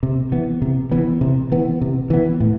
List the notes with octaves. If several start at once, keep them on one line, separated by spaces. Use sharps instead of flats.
C3
E3 B3
C3
E3 B3
C3
E3 B3
C3
E3 B3
A2